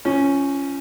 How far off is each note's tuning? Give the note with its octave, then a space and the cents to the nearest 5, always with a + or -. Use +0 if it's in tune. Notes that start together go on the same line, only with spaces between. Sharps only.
F3 -30 C#4 +0